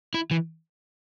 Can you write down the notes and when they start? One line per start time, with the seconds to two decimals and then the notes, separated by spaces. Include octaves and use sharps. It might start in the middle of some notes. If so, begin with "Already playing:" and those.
0.14 E4
0.31 E3